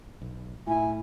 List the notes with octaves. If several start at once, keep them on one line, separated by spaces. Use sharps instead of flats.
B1
A2 E4 G#5